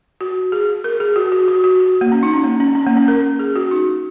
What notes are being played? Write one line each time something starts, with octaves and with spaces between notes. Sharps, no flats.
F#4
G#4
A#4
G#4
F#4
F#4
F#4
F#4
F#4
A#3
C#4
D#4
C#4
A#3
C#4
C#4
A#3
C#4
A#4
G#4
F#4
D#4